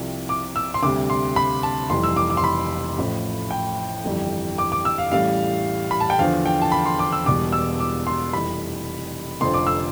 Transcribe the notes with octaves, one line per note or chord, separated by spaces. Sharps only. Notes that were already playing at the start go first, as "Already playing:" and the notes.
Already playing: C2 C3 F3
D6
E6
C6
D2 C3 G3 D6
C6
B5
A5
F1 F2 E3 G3 C6
E6
D6
D6
C6
B5
A1 A2 F3
G5
G1 F2 E3 G3
D6
D6
E6
F5
A1 A2 E3 G3 F5
B5
A5
G5
E2 D3 F3 F5
G5
A5
B5
C6
D6
E6
E1 E2 B2 G3 D6
E6
D6
C6
F1 F2 E3 G3 B5
F1 F2 D3 F3 C6
D6
E6